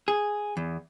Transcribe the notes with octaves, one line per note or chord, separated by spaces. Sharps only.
G#4
E2